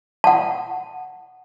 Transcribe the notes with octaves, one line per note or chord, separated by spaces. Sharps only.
F#5 A5